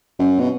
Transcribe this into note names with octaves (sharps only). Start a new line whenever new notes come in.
F#2
B2